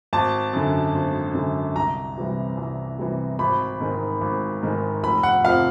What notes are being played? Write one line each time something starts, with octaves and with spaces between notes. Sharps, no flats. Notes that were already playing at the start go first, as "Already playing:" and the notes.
G#1 A5
F#2 D3
G#1
F#2 D3
C2 A#5
C3 E3 G3
C2
C3 E3 G3
G#1 B5
G#2 D#3 G#3
G#1
G#2 D#3 G#3
F1 B5
F#5
F2 C3 F3 F5